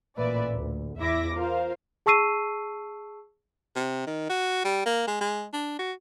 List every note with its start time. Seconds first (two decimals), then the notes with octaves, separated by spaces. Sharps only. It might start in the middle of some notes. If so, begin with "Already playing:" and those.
0.17 A1 A#2 B4 D5 E5
0.53 D2
0.98 E2 E4 E5 D6 A#6
1.34 F4 A#4 C5 F5
2.06 G#4 A5 C#6 E6 C7 D#7
3.76 C3
4.07 D#3
4.29 F#4
4.64 G3
4.86 A#3
5.07 G#3
5.21 G#3
5.53 D4
5.79 F#4